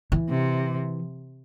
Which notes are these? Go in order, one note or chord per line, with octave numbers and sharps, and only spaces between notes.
E3
C3